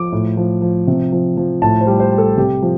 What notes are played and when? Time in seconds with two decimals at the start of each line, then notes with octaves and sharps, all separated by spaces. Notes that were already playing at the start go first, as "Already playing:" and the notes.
Already playing: F3 D6
0.12 A2
0.37 F3
0.62 F3
0.87 C3
1.12 F3
1.37 F3
1.62 A2 A5
1.81 C5
1.87 G3
2.00 C5
2.12 G3
2.18 A4
2.37 C3 G4
2.62 F3